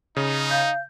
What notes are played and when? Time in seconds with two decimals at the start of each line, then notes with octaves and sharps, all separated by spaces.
0.16 C#3 D#4
0.51 F5 G6